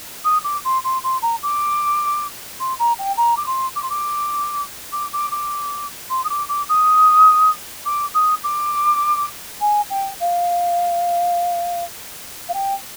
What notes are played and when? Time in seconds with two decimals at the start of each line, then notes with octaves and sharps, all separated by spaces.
0.24 D#6
0.44 D6
0.64 C6
0.84 C6
1.03 C6
1.22 A#5
1.42 D6
2.59 C6
2.79 A#5
2.98 G5
3.17 A#5
3.36 D6
3.46 C6
3.75 D6
3.82 C6
3.89 D6
4.92 D6
5.13 D6
5.31 D6
6.09 C6
6.24 D#6
6.29 D6
6.48 D6
6.69 D#6
7.85 D6
8.14 D#6
8.43 D6
9.60 G#5
9.89 G5
10.20 F5
12.48 F5
12.53 G5